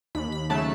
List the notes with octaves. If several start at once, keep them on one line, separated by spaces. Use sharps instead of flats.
D#2 B5
B5
C#3 F#3 A3 A5